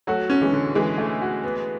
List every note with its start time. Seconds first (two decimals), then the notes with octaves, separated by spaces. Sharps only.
0.07 F#3 A3 F#4
0.30 C#4
0.41 E3 G#3
0.52 D3
0.75 D3 E3 G#3
0.98 A3
1.21 F#4
1.43 B3